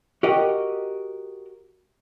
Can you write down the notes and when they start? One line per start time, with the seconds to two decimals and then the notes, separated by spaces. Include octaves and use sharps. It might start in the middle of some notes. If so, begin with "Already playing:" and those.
0.23 F#4 G4 A#4 D#5